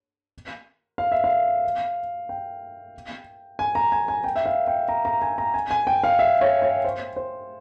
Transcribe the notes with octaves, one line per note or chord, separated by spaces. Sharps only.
F5
E5
F5
G5
G#5
A#5
G#5
G#5
G5
E5
F5
G5
A#5
A#5
G#5
A#5
G#5
G#5
G5
F5
E5
C#5
C#5
C5
C5